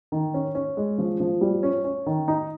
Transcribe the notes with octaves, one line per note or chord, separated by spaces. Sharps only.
D#3
C#4
C#4
G#3
F3
F3
G3
C#4
C#4
D#3
D#4